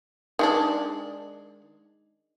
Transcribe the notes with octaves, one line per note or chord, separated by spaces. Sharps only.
D#3 G#3 D4